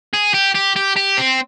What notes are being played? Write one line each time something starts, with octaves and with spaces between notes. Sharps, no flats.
G#4
G4
G4
G4
G4
C4